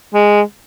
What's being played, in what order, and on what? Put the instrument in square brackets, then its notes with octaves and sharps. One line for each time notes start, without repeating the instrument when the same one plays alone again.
[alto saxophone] G#3